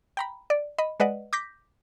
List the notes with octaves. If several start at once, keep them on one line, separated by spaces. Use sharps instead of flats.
G5 A#5 B5
D5
D#5 B5
G#3 B4 D5 D#5 F#5
D6 G6 A#6 B6